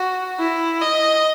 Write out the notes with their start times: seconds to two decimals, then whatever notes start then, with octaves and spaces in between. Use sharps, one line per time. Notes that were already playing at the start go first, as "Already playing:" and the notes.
Already playing: F#4
0.39 E4
0.82 D#5